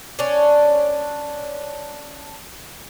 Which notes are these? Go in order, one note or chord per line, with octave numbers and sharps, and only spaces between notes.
C#4 D4